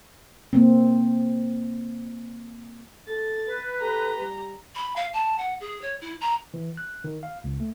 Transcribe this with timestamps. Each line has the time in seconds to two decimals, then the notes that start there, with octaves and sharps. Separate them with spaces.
0.53 A#3 C4
3.08 A4 A6
3.46 B4
3.81 G4 A4 A#5
4.18 G3
4.75 B5
4.96 F5
5.13 A5
5.38 F#5
5.60 G#4
5.81 C#5
6.01 E4
6.21 A#5
6.54 E3
6.77 F#6
7.04 D#3
7.23 F5
7.44 C#2
7.60 A3